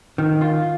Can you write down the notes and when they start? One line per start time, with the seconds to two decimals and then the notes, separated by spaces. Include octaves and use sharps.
0.18 D#3
0.41 F4